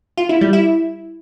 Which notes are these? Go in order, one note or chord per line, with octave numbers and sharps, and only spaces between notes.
F4
E4
G3
E4